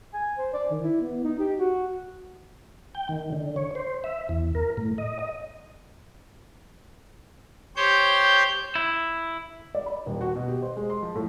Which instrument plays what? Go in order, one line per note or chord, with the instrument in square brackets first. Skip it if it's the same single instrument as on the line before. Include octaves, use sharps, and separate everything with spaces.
[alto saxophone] G#5
C5
D5
D#3
E4
B3
D#4
G4
F#4
[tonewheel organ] G5
D#3
D3
C#5
C5
E5
E2
A#4
A2
D#5
D#5
[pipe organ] G4 C5 C#5 G6
[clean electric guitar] E4
[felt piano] D5
B5
D#1
F#4
B2
G4
C5
G#3
C6
F3
A2